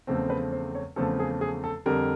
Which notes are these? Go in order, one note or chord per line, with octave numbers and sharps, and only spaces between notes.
E2 C#3 F3 A3 C4 A4
B4
C5
C#5
E2 C#3 F3 A3 C4 A4
G#4
G#4
A4
F2 D3 G3 A#4